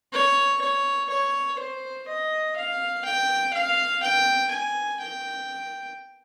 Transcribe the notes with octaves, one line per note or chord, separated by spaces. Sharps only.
C#5
C#5
C#5
C5
D#5
F5
G5
F5
G5
G#5
G5